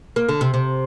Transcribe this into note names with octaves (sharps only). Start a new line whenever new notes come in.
A#3
D3
C3
C3